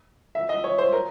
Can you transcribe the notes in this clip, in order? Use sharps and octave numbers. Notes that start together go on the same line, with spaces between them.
E5
D#5
C#5
C5
A#4